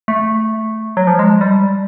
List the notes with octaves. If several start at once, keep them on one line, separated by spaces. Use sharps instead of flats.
A3
F#3
F3
G#3
G3